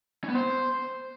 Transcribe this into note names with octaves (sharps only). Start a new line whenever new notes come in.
C#4
B3
C5